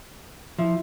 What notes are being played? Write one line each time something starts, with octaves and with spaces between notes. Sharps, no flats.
F3 E4